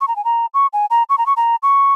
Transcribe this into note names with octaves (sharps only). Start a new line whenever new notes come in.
C#6
A#5
G#5
A#5
C#6
G#5
A#5
C#6
A#5
C#6
A#5
C#6